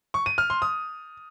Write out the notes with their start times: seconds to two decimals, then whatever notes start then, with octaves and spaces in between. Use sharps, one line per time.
0.14 C#6
0.26 D#7
0.38 F6
0.50 C6
0.62 D#6